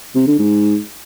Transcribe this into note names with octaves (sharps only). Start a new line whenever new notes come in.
C3
D3
G#2